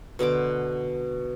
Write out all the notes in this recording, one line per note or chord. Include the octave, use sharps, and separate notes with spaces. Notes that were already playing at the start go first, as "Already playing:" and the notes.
B2 D3 C5 D6